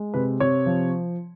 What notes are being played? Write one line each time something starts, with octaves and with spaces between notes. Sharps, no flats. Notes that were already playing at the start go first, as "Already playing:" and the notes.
Already playing: G#3
C3 B4
C3 C#5
F3